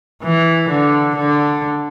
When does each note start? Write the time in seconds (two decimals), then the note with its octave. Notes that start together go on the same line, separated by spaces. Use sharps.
0.23 E3
0.69 D3
1.16 D3